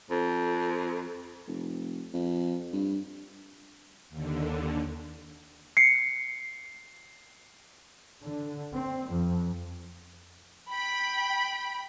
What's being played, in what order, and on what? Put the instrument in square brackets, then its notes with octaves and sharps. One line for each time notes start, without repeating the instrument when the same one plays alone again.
[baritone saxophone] F2
[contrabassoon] F1
F2
G2
[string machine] D#2 D3
[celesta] C7 C#7
[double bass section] D3
C4
F2
[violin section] G5 B5